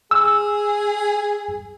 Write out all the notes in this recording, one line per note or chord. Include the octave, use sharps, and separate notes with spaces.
G#4 E6